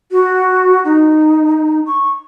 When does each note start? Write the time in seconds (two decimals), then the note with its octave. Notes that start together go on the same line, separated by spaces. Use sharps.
0.11 F#4
0.84 D#4
1.86 C#6